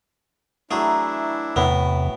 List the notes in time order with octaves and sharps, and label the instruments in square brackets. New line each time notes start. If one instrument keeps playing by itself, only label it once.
[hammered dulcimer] E3 F#3 A#5 [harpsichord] A3 G#4 [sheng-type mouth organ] D4 E4
[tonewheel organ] E2 C3 [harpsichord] A2 B3